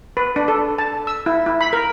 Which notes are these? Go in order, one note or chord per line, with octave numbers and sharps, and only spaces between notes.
B4
D4
A4
A5
E6
E4
E4
B5
A#4